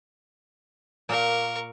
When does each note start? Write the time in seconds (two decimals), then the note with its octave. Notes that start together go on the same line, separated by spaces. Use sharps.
1.09 A#2 A#3 A#4 C#6